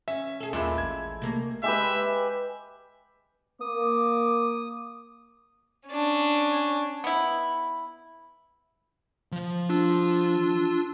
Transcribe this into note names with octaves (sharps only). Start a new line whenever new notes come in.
C#4 E5
G#4 A4
D#2 A#2 G#3 A3 E4 E5
A1 G#6
C3 A3 A#3
G#3 G4 B4 E5
A#3 D6 D#6
C#4 D4
B3 E4
F3 F5
D4 F4 E6